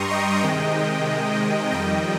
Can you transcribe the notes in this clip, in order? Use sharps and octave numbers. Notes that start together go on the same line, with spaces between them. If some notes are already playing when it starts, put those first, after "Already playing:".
Already playing: G2 G3 A#5 C6 C#6 D#6
D#5 G5
C3 D#3 G#3 D#5 G5
F2 D#3 G3 D#5 G5